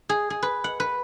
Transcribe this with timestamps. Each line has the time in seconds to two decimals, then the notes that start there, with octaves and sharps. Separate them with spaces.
0.09 G#4
0.30 G#4
0.43 B4
0.64 F#5
0.80 B4